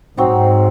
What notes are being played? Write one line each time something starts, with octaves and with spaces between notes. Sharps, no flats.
G#2 F#3 C4 D#4